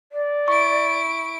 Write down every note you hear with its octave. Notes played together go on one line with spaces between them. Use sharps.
D5
E4 C#6 D7